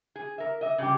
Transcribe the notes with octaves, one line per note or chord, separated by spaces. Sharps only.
G#4
A#4 E5
D#5 E5
C#3 G3 G4